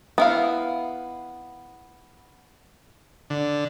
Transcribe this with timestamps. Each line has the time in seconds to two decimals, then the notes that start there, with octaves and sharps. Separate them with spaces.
0.18 B3 E4 F5
3.30 D3